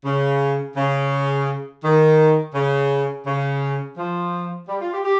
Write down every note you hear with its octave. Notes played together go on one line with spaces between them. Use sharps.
C#3
C#3
D#3
C#3
C#3
F3
G3
F4
G4
G4